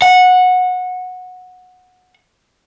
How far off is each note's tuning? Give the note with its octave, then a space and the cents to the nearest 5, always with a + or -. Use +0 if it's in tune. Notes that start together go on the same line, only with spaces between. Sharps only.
F#5 -15